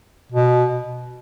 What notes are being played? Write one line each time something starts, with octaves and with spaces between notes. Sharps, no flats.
B2